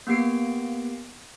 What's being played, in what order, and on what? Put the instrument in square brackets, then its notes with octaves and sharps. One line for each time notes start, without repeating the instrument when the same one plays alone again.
[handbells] A#3 B3 G4 C7 D7